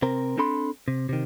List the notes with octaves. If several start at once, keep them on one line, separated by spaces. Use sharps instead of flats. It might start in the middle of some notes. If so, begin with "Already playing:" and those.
C3 C4 A#4
C4 D4 A4 B5 C6
C3
C3 D#3